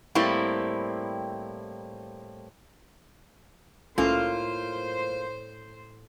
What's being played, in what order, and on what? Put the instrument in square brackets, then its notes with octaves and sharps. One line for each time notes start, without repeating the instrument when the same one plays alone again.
[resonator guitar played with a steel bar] A2 G3 A#3 C4 E4
[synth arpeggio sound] C2 C#4 A#4 [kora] A2 [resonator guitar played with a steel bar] A#3 F4 [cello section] C5